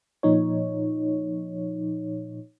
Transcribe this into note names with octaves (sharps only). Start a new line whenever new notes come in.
A#2 F3 D#4 C#5